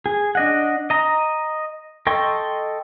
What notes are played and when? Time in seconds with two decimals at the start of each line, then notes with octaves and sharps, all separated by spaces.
0.06 G#4
0.35 D4 D#5 F#5
0.90 D#5 A#5
2.07 A4 D#5 G5 C6 C#6